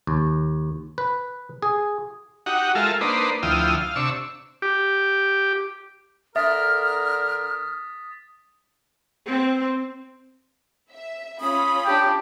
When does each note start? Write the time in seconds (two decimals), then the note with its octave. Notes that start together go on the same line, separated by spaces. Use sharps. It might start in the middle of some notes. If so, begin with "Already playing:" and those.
0.07 D#2
0.98 B4
1.62 G#4
2.46 D#4 F#4 G4 F#5
2.75 G#3 F4 A4 A#4 E5 F5
3.01 A#3 D4 D#4 B4 C5
3.43 D2 F3 E4 G5 D#6 F6
3.81 F5
3.96 C3 D4 C#6 E6
4.62 G4
6.36 D3 A#4 E5 D#6 F6 A6 B6
9.27 C4
10.92 E5
11.40 C#4 F4 B5 D#6
11.85 D4 G4 G5